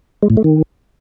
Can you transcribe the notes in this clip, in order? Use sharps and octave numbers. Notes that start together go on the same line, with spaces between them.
G#3
A2
A3
D#3